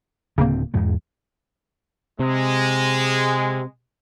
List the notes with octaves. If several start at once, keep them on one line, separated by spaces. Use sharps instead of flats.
D1 D2 C#3 A#3 C4
E2 G#2 G#3
C3 G#3